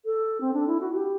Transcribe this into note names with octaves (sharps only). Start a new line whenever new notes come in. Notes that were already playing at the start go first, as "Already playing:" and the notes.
A4
C4
D4
E4
F#4
G4